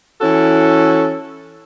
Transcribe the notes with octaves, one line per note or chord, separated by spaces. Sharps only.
E3 C#4 E4 F#4 A4